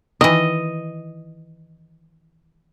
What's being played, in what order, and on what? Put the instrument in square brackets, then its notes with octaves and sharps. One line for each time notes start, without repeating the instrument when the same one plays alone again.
[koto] D#3 E3 [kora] D#5